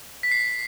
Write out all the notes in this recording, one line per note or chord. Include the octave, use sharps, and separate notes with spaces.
B6
C7